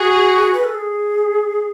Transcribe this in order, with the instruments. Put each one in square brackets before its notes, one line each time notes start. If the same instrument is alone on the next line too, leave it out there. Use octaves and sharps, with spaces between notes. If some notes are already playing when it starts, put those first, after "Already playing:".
Already playing: [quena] F#4 [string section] G#4
[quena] B4
A4
G#4